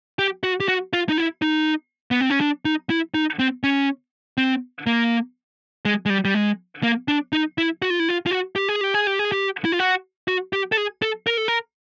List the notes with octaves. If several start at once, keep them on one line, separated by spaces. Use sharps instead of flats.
G4
F#4
G4
F#4
F4
D#4
E4
D#4
B3
C4
C#4
D4
D#4
E4
D#4
C4
C#4
C4
A#3
G#3
G#3
G3
G3
G#3
A#3
D4
D#4
E4
F#4
F4
E4
F4
F4
F#4
G4
G#4
G4
G#4
G4
G#4
G4
E4
F4
F#4
F#4
G4
A4
G#4
A4
A#4
A4
A#4